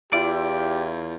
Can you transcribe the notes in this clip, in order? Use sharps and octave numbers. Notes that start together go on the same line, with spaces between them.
E2 E4 F4 G4 D5